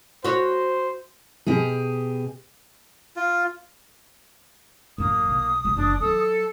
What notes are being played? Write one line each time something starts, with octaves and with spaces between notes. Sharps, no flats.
F#4 C5 C#5
B2 G4 G#4
F4
A1 F#2 A#3 D#6
B1
A1 C#3
F#1 F3 D4
F#3 E4 A4